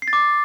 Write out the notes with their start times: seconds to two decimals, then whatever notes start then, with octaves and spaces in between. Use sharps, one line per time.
0.02 C7
0.08 A6
0.13 D6